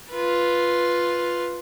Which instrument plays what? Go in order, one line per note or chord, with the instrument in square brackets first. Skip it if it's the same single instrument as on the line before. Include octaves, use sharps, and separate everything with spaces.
[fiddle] F4 B4